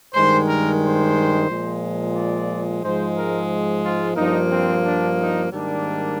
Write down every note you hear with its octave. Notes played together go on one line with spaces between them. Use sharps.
G2 D#3 G#3 C5
A#4
C5
A#2 F3 G#3
D5
G#2 F3 G#3 C5
A#4
F4
G2 F3 A#3 D#4
C4
D4
D#4
G#2 D#3 G3 A#3 D4